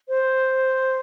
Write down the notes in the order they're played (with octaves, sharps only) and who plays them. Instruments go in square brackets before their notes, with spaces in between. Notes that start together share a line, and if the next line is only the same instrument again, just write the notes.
[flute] C5